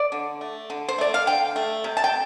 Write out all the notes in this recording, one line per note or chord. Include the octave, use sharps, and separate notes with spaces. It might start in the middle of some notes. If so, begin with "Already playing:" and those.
Already playing: D5
D3
A3
D3
C5
A3 D5
F5
D3 G5
A3
C3
A5
G5